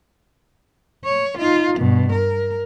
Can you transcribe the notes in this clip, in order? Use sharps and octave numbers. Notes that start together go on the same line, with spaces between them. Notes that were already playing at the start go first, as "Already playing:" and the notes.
C#5
D#4 F4
G2 B2
A#4